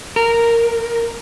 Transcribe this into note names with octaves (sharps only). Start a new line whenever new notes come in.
A#4